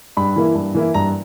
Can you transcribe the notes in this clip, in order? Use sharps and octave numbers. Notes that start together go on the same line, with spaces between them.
G2 B5
E3 A#3 E4
G2
E3 A#3 E4
G2 A#5